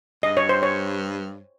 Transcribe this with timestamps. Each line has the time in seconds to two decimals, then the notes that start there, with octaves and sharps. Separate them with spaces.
0.23 G2 D#5
0.37 C#5
0.49 C5
0.63 C#5